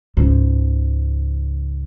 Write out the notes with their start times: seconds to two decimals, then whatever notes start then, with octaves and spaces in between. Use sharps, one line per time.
0.17 C#2 G#2